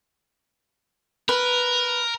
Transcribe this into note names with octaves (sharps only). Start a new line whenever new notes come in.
A#4 B4